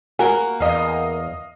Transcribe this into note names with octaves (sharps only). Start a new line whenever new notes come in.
A#3 F#4 A#4 G#5
E2 D#5 F5